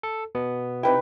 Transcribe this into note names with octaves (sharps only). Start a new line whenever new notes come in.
A4
B2 B3
C3 D#4 E4 B4 G5